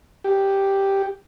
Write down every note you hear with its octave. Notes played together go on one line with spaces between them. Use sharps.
G4